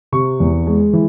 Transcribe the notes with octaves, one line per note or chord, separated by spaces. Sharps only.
C3 C#6
E2
G#3
E3